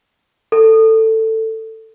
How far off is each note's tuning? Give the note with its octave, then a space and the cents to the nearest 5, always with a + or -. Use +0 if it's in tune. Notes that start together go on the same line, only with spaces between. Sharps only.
A4 +15